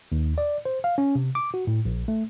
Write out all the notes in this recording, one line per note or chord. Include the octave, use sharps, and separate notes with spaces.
D#2
D5
C5
F5
C#4
C3
D6
F#4
A2
A#1
A3